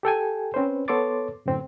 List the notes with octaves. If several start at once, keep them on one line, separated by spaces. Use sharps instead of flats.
G4 A4 G5 G#5
C4 C#4 B4 C5
B3 A4 C#5 C6 D6 A6
F#2 A2 D3 C4